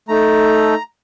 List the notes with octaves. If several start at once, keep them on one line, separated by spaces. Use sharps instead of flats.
A3 D#4 A4 A#5